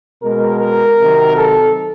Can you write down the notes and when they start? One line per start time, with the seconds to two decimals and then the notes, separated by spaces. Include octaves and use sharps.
0.21 B2 G#3 A#4
0.59 A#4
0.97 C3 D#3 F#3
1.35 A4